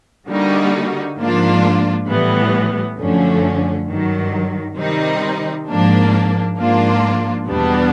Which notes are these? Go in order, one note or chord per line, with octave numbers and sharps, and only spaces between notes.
D3 G3 A#3 D#4 F#4
G#2 F3 A#3 D4 F4
A2 E3 G3 B3
F#2 D3 F3 A3 C#4
G2 D#3 F#3
C3 D#3 G3 C4 D#4
G#2 F3 A#3 D4
G#2 F3 A#3 D4 F4
E2 B2 G3 B3 D4